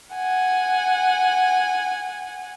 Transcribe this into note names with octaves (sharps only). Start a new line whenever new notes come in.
F#5 G#5